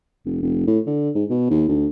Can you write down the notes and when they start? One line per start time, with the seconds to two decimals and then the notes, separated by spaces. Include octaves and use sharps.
0.26 F1
0.43 F1
0.67 A2
0.87 D3
1.15 G#2
1.30 B2
1.50 D#2
1.68 D2